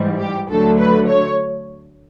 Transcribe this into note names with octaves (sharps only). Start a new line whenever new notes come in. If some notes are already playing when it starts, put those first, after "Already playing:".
Already playing: G#2 E3 G3
G4
D2 D3 F#3 A3 A4
B4
C#5